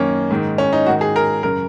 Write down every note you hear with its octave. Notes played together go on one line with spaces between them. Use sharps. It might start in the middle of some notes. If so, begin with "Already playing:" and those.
Already playing: F#2 D#3 A#3 C#4
G#2 D#3
C#4
D#4
G#2 D#3 F#4
G#4
A#4
F#2 C#3 A#4